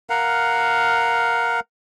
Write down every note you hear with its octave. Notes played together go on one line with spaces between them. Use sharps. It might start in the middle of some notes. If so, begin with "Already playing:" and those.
A#4 F5 F#5